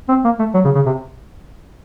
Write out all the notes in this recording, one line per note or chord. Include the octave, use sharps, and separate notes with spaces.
C4
A#3
A3
F#3
C#3
C#3
C3